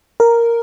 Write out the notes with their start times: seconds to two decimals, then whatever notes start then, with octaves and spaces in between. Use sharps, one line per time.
0.20 A#4